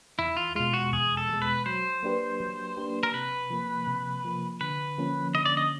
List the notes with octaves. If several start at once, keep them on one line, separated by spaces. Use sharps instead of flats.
E2 E4
F4
B2 G#3 F4
F#4
E2 G#4
A4
B2 G#3
B4
F#3 C5
A#3 D4 G4 B4
F#3
A#3 D4 G4 B4
A#4
C3 B4
F3 A#3
C3
F3 A#3
D3 B4
F3 A#3 C#4
D3 D#5
D5
D#5